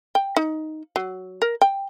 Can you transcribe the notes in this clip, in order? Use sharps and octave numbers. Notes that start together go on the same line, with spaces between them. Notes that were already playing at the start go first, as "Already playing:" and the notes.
G5
D#4
F#3
A#4
G5